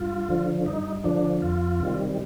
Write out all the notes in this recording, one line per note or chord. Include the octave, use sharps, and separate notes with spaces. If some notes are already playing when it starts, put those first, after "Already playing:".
Already playing: G2 F4
D3 F3
G2 D#4
D3 F3 D4
F2 F4
C3 D#3 G3